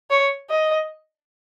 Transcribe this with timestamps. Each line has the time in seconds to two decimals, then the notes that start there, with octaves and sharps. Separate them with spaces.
0.10 C#5
0.50 D#5